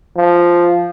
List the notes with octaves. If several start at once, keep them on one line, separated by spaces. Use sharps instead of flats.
F3